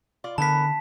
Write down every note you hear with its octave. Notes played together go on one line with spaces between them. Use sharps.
F4 D5
D3 E3 B3 A#4 A5 B6